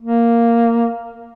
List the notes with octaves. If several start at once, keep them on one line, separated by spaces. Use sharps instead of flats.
A#3